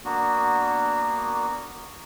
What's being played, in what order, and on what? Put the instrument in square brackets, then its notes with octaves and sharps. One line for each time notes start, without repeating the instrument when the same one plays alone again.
[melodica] A#3 B3 D4 F#4